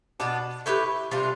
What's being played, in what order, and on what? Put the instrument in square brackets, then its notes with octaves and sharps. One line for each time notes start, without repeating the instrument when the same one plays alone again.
[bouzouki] B2 B3 D4
A3 E4 G4 B4
C3 G3 D4 F4